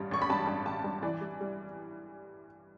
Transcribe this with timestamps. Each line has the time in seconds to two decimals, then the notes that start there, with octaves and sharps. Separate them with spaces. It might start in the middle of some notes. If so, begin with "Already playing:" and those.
Already playing: A1 G2 G3
0.11 A1 C#6
0.22 B5
0.30 G2 A5
0.47 G2
0.66 A1 A5
0.84 G2
1.03 E3 D5
1.21 G3
1.40 G3